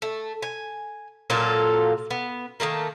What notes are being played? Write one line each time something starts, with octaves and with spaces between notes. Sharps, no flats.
A3
G#5
A#2 F#3 F4 A4
B3
D#3 G3 A3 A#3